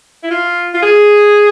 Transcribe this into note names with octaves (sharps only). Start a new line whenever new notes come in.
E4
F4
F4
G#4